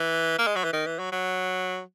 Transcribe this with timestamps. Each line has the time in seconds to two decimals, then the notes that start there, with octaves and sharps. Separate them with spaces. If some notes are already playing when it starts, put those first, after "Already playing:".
Already playing: E3
0.39 A#3
0.47 G#3
0.56 F#3
0.64 E3
0.73 D#3
0.86 E3
0.99 F#3
1.12 F#3